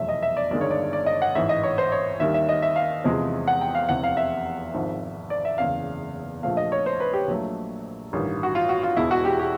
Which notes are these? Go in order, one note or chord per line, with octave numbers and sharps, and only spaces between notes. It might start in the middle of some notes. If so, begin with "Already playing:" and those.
Already playing: F1 E2 B2 F#3 A3 E5
D#5
E5
D5
G1 G2 D#3 G#3 D5
C#5
D5
D5
D#5
F#5
A1 G#2 E3 E5
D#5
C#5
C5
C#5
D#2 D#3 G3 E5
E5
D#5
E5
F5
E2 C3 F3 G#3
F#5
G5
F5
F1 E2 C3 E3 F#5
F5
E5
G#1 G#2 F3
D5
E5
F#1 E2 C#3 F5
A#1 A#2 F3 A3 F5
D#5
C#5
C5
B4
G4
A#1 A#2 F#3 A3
A1 G2 D#3 G3
F#4
F4
F#4
F4
E1 E2 B2 G#3 E4
F#4
G4
G4